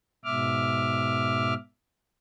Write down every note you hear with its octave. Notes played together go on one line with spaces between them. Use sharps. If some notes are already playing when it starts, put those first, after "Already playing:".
G#2 B2 E5 D6 F6